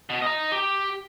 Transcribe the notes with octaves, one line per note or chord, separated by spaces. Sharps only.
B2
D#5 A#5
G4